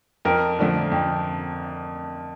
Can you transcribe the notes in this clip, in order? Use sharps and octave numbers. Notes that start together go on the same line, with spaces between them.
F2 A#4
D3 F3 A3
F2